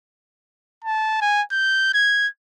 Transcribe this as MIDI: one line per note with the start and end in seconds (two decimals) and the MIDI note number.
0.84 1.20 81
1.21 1.42 80
1.52 1.90 91
1.94 2.28 92